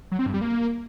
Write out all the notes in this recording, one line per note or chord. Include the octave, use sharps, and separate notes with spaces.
F#3
C4
G2
G3
A#3